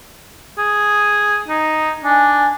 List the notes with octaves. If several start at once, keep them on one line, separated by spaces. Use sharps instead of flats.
G#4
D#4
D4 G#5